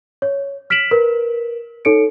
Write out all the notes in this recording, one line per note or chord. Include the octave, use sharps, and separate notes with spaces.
C#5
F6 B6 D7 E7 F#7
A#4 B4
D#4 A4 C#5 C#7 D7